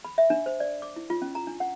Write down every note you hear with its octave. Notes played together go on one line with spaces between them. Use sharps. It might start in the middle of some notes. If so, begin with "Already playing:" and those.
B5
E5
D4
C5
D5
D6
E4
F4
C#4
A#5
D4
F#5